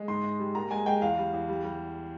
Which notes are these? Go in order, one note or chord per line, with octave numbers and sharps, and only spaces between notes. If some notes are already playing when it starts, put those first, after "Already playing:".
Already playing: G#3
G#2 C6
G#2
G3
A#2 A#5
G#3 G#5
G#3 G5
E2 F5
G3
E2
G3
G3